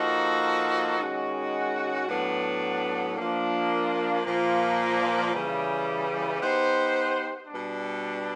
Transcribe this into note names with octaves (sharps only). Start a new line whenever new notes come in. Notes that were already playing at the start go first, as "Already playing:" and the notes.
Already playing: F3 A#3 D#4 F#4 A4
D#3 G#3 C#4 F#4
A2 F#3 B3 D4
F3 A#3 D4
A#2 F3 A#3
C#3 E3 G3
B3 D#4 G4 C5
B2 G3 B3 D4